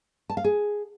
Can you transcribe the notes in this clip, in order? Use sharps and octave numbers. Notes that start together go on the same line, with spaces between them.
A5
F5
G#4